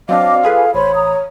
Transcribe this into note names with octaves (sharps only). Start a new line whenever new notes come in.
F#3 C4 D4 D#5 F5 D6
F4 G#4 A4 B4
A1 C5 C#5 B5 C6
A#5 D#6